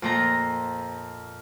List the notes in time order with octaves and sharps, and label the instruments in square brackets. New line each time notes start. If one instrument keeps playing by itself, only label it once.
[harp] F2 A#2 A#5